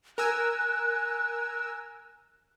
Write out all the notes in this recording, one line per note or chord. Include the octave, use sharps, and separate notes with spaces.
A#4 G#5 E6 F#6